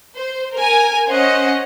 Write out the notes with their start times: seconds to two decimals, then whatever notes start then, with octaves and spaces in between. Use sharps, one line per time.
0.14 C5
0.54 A#4 G#5
1.08 C#4 C5 D#5 F#5